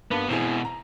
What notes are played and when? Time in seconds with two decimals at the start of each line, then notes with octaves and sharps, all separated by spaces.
0.11 G2 A#3 B3
0.29 B2 E3 C4 E4 G#4
0.65 A#5